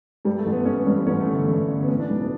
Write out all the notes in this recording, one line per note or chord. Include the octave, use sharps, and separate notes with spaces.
G2 G3
A3
A1
B3
A1 C#4
B3
G2 C#4
B3
A1 C#4
A3
D3
A3
A1
D3
B3
A2 C#4
D4
B1 B3
B3